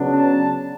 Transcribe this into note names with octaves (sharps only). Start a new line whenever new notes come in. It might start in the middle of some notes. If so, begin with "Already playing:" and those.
Already playing: C#3 F#3 B3 D4
A5